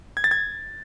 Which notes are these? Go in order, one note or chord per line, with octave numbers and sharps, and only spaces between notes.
G#6
A6
G#6